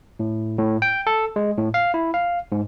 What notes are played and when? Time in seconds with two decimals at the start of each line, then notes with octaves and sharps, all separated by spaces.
0.20 A2
0.58 A2
0.82 G5
1.07 A4
1.36 G#3
1.58 A2
1.74 F5
1.94 E4
2.14 F5
2.52 G#2